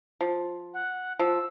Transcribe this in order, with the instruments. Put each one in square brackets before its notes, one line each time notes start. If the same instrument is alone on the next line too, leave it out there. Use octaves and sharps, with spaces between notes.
[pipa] F3
[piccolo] F#5
[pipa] F3 [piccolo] E6